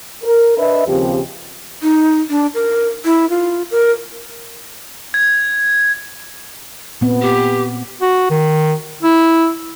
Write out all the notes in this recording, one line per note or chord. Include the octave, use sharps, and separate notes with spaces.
A#4
D4 B4 D#5 E5
D#2 C#3 F3 C4 G4
D#4
D4
A#4
E4
F4
A#4
G#6
A#2 B3 C4
G4
F#4
D#3
E4